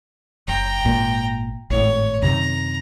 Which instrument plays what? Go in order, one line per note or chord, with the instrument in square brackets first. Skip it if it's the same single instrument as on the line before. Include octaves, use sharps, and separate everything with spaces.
[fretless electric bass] F#1 [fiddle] G5 A#5
[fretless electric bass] G#1 A#2
[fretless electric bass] G#1 A2 [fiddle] C#5
[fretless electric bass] F#2 C3 D#3 [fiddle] A#5